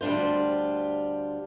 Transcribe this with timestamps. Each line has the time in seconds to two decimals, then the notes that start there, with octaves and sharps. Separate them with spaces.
0.01 D2 G3 D4 F4 C5